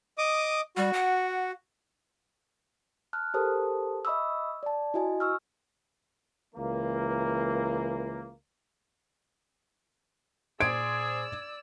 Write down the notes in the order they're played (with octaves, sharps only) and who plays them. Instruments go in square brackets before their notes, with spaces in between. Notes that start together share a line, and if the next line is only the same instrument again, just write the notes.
[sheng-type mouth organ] D#5 D6 D#6
[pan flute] G3 [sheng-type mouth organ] F#4
[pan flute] F#5
[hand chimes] A5 F6 F#6
G4 A4 A#4 C5 A5 D#6
D#5 E5 B5 C#6 D#6 E6
D5 A5
E4 F#4 D#5 G#5
C#6 E6 F6
[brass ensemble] C#2 E3 A#3
[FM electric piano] A#2 C5 C6 [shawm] G#4 [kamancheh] D5 E6 [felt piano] G#6 D7